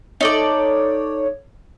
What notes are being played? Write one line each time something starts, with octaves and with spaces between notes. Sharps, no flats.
D#4 A4 C#5 D5